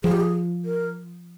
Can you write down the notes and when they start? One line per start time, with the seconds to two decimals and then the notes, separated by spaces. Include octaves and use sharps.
0.03 F3 G#4
0.12 G4
0.20 G#4
0.65 A#4